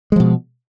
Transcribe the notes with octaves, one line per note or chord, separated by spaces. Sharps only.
B2 F3 G#3